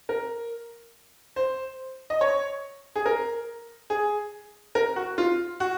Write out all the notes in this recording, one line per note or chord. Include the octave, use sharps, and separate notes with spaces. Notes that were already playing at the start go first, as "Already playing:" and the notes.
A#4
C5
D#5
C#5
G#4
A#4
G#4
A#4
F#4
F4
F#4